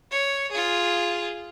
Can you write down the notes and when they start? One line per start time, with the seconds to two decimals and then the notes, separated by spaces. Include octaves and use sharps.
0.11 C#5
0.51 F4 G#4